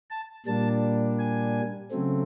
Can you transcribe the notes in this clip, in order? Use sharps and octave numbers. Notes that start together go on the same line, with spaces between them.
A5
A#2 G3 A#3 D4 A5
G#5
C#3 F#3 A3 C4